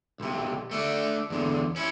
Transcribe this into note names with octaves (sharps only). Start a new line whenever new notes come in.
B1 C3
A3 D4
E2 D3
C#4 E4